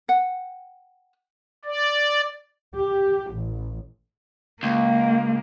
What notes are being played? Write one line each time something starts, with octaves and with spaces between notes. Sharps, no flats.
F#5 G5
D5
G4
A1
C#2 A#3